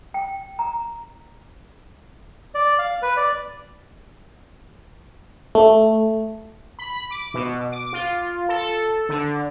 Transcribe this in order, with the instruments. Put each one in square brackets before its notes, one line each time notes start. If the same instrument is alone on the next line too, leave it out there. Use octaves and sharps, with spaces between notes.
[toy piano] G5
A#5
[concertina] D5
F5
B4
D5
[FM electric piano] A3
[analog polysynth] B5
D6
B2
D6
F4
A4
D3